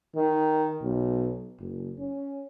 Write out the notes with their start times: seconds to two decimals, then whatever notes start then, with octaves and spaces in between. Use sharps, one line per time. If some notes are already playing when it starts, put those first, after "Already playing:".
0.15 D#3
0.83 B1
1.59 F#1
1.99 C#4